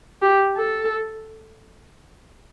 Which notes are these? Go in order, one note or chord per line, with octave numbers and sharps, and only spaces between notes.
G4
A4